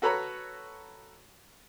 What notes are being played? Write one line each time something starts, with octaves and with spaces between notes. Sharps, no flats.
F#4 A4 B4 C#5 A#5 B5